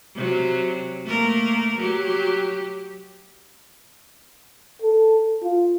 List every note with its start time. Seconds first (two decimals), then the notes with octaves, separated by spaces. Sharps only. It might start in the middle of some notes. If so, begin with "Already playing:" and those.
0.15 C3 F#3
1.04 A3 A#3 A#4
1.78 F#3 G4
4.82 A4
5.43 F4